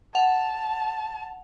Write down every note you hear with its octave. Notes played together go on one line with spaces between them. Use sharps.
F#5 A5 F7